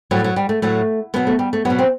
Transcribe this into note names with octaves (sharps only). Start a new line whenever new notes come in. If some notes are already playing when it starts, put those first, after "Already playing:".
A2 F#3 G3
F#3
G3
A3
A2 F#3 A3
B2 F#3 B3
A3
G3
A3
F#3 B3
B2
C4